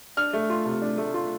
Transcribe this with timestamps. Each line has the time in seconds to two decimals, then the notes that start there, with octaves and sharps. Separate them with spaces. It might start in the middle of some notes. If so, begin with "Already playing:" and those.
0.17 D4 F6
0.33 A3
0.50 F4
0.65 C3
0.82 D4
0.98 A3
1.14 F4